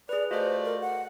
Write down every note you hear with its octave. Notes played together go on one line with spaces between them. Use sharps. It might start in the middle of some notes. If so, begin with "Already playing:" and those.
G#4 B4 D5
A3 F4 F#4 C5 D5 D#5
A#4
F#5